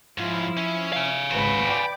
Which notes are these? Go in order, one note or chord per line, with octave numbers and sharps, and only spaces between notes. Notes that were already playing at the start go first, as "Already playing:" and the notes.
G#2 F3 C#4 E4 F4
C#4 E5
F5 G#5
G#1 C#2 F#4 B4 C5 B5
D5 G5 D6